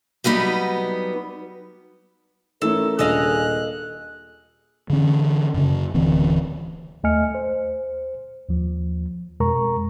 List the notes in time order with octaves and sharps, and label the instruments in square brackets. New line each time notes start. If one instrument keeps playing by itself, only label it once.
[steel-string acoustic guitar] F#3 G3 B3 D#4
[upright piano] E3 A3 C#4 [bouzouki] A4 [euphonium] A#4
[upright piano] D#1 D4 [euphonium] G#4 [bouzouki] A4 D#5 F5 [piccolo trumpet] F#6
[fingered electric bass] D3 E3 C4 C#4
F#2 C#3
D1 D3 E3 C4
[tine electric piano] D#2 A3 D#5 G#5 F6 C#7
C5
D#2 F3
F2 B2 G#3 A#4 A#5 C#6